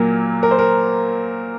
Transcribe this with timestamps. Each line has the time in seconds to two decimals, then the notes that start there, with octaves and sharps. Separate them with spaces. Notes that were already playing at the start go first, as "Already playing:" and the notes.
Already playing: A#2 F#3 A#3 A#4
0.43 A#4
0.51 C5
0.59 A#4